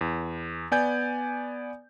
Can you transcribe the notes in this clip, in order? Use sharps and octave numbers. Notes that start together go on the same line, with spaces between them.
E2
B3 D5 G#5 G6